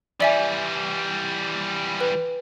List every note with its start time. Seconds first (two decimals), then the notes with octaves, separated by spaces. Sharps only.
0.20 E3 G3 D5 E5 G#5
2.01 B4